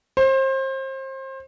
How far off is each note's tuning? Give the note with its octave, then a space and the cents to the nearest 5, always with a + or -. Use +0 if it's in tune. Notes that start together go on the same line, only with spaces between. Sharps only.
C5 +30